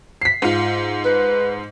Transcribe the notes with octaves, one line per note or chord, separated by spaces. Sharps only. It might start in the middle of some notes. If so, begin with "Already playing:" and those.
B6 C7
G#2 F4
B4